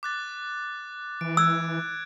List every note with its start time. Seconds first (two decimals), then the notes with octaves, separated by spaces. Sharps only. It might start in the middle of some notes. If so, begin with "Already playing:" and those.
0.03 D6 F#6 A6
1.21 E3 D7
1.37 E6 F#6 G#6